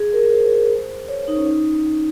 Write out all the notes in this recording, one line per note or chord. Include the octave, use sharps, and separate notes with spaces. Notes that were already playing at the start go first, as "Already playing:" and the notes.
Already playing: G#4
A#4
C5
C#5
D#4
C#4
D#4